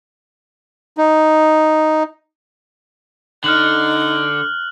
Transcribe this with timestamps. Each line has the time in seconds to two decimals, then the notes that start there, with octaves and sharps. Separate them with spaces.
0.98 D#4
3.44 D3 D#4 F6 F#6 F#7